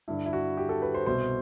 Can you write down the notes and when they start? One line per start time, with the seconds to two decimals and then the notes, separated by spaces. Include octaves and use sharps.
0.08 G2 D3 E4
0.26 E4
0.33 F#4
0.57 G4
0.69 A4
0.82 B4
0.94 C5
1.06 C2 B2 C5